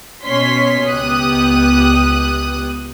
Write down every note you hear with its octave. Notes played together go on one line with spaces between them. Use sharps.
B2 C#4 C#5 C6 B6
C#2 B3 G4 D#6 F#6